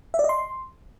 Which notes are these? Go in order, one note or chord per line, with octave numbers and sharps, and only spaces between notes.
E5
D5
D#5
C6